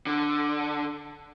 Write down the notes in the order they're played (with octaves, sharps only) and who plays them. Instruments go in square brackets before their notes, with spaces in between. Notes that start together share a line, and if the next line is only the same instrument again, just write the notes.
[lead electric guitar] D3